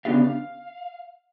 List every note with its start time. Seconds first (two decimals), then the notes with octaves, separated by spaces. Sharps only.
0.05 C#3 B3 D4 G4 F5
0.24 F5